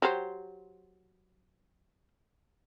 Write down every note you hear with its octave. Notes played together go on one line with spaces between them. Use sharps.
F#3 G4 C5